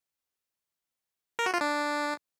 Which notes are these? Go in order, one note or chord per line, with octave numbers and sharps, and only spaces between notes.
A#4
F#4
F4
D4